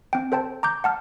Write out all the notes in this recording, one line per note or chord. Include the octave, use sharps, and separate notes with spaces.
C4 G5
A4 C5 G5 A5
A#5 D6 G6
F#5 A5 F6